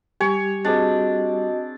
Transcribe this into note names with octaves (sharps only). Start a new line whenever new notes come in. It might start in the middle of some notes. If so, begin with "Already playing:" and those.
G3 G4 C#5 G#5
C4 D4 F#4 G#4 D#5